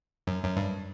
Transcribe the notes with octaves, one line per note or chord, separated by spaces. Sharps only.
F#2
F#2
G2